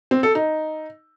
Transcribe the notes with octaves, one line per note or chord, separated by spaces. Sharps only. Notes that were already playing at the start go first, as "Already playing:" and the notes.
C4
A4
D#4